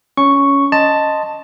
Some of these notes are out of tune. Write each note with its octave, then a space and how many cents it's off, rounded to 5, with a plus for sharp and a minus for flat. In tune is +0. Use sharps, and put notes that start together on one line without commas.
C#4 +10 C#6 +0
D#5 +0 A5 +5 C6 +0